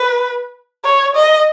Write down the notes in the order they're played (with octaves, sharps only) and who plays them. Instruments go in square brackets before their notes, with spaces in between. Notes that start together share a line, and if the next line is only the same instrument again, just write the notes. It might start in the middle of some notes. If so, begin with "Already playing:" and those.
Already playing: [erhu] B4
C#5
D#5